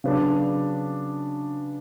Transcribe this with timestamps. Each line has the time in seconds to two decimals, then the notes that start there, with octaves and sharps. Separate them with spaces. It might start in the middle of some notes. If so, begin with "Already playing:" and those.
0.04 C#3 F#3 B3 D4